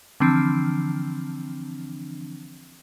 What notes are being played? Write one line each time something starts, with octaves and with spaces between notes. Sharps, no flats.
D3 E3 F3 C4 D4